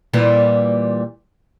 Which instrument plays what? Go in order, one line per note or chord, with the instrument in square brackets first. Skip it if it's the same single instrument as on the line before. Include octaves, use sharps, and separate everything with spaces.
[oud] A#2 E3 G3